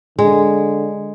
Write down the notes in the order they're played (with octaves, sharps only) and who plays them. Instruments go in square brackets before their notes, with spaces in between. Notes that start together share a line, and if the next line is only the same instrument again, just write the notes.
[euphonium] D3 [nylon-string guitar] G#3